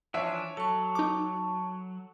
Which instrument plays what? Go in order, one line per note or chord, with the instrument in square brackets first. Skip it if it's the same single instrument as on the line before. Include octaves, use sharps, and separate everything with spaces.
[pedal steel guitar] E3 F3 D4 [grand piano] C#5 E5
[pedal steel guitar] F#3 [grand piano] A4 [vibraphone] A5 C#6
[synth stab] D#4 D6